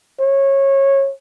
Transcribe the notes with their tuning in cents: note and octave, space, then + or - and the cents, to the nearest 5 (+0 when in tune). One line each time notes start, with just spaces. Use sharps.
C#5 -20